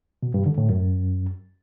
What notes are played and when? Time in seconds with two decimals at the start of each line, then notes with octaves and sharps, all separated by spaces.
0.23 B2
0.34 G2
0.46 D3
0.58 A2
0.69 F#2